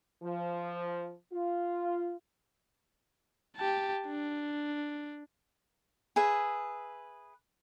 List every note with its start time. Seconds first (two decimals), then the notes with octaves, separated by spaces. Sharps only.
0.23 F3
1.33 F4
3.56 G4 A5
4.07 D4
6.16 G#4 B4 E5